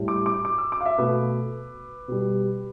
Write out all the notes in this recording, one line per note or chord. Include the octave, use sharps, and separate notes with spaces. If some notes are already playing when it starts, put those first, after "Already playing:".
Already playing: A2 G3
D6
D6
D6
E6
D6
F5
E5
B2 A3 B4
B2 G3